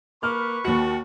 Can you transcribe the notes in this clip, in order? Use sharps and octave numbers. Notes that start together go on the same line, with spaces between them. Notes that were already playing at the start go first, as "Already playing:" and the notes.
A#3 B4 B5 C#6 F6
D#2 F#4 C#7